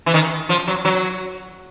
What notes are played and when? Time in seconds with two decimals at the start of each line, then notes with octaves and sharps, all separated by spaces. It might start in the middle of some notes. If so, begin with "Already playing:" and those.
0.06 E3
0.14 D#3
0.49 F3
0.68 F#3
0.85 F#3